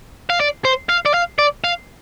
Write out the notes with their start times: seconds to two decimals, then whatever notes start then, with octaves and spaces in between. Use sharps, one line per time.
0.30 F5
0.40 D5
0.65 C5
0.89 F5
1.06 D5
1.14 F5
1.39 D5
1.64 F5